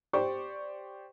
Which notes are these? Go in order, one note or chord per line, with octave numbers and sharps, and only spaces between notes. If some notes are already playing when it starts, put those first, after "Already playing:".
G4 C5 D5 C#6